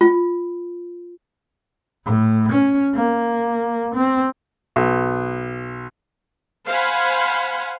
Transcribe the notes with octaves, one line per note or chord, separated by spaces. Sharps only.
F4
A2
C#4
A#3
C4
B1
C5 F5 F#5 G#5 B5